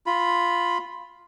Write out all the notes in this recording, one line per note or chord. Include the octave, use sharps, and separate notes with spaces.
F4 B5